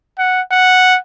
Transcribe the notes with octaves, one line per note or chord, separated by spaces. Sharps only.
F#5
F#5